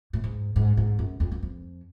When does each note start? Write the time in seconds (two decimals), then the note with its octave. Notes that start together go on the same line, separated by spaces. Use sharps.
0.13 A2
0.24 G#2
0.56 G#2
0.77 G#2
0.99 F#2
1.20 F2
1.32 F#2
1.43 F2